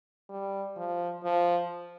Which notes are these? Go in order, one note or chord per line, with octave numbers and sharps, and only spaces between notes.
G3
F3
F3